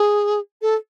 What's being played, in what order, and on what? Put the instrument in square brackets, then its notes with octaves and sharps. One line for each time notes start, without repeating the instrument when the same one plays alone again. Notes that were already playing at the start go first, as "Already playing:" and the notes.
Already playing: [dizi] G#4
A4